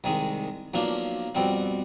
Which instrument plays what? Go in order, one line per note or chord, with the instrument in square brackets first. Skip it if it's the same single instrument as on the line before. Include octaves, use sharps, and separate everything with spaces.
[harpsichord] C2 D#3 G#3
B1 F3 A#3 D4
F2 B2 G3 C4